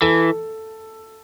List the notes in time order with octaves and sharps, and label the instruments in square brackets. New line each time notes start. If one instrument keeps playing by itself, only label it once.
[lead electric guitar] E3 [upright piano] A4